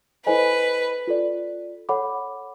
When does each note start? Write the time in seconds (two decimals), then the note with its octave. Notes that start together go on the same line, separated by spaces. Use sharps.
0.26 E4 A4 B4 C5 D#5 G#5
1.07 F4 A4 D5
1.89 A4 C#5 F#5 B5 D6